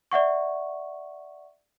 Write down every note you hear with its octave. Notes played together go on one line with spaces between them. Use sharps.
D5 E5 F#5 C#6